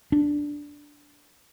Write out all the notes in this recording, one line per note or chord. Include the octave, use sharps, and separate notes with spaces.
D4